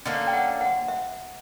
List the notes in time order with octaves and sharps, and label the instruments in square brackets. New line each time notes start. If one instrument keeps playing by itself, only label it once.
[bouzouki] D3 A#3 C#4
[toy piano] G5
F#5
F#5
E5